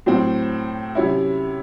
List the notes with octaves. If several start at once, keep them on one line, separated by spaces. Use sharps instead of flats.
A2 F#3 C4
C3 F#3 C#4 E4